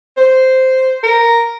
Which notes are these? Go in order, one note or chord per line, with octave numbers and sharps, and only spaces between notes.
C5
A#4